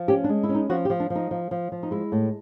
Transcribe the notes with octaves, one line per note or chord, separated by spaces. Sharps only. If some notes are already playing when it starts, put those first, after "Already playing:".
Already playing: F3
C#4 G4
D4
G#3
E4
C#4
D#4
F3 F#4
G4
F3
D4
F3
D#4
F3
F3
F3
D#4
G#3 E4
A2